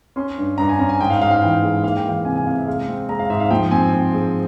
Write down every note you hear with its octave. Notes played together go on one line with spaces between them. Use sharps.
C#4 C6
G2
G2 A#5
G#5
C#4 A#5
G#5
G#2 G5
F5
G#2 F5
F5
E3 G5
G#3
A#3 F5
G5
E3 F5
C3 G#5
G#5
C3 F5
E5
G#3 F5
C4
G#3 A#5
F5
G#2 E5
F5
F3 G5
C4 G#5
C4
G#3